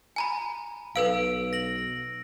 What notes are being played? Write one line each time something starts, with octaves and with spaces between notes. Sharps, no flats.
G#5 A#5 B5
B1 A4 B4 F5 E6 D7
A#6 F#7